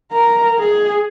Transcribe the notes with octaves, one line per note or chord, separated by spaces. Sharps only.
A#4 A#5
G#4